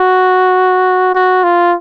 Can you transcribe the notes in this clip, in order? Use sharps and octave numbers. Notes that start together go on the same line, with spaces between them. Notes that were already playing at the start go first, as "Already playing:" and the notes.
Already playing: F#4
F#4
F4